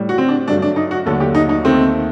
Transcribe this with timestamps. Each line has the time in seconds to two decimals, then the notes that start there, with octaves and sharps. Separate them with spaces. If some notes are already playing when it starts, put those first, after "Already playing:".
Already playing: A2 G3
0.09 F#4
0.18 C4
0.28 D4
0.48 G2 F#3 A3 D4
0.62 D4
0.76 D#4
0.91 F#4
1.06 D#2 D3 F#3 A3 A4
1.20 G4
1.35 D#4
1.49 D#4
1.65 D#2 D#3 A3 C4